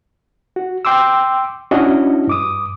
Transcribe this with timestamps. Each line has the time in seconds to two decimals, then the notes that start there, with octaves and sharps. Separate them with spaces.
0.56 F#4
0.85 G5 C6 D6 E6
1.71 C#4 D4 E4 F#4 D#5
2.27 G2 D6 D#6